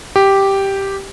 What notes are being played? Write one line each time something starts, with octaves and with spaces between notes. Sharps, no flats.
G4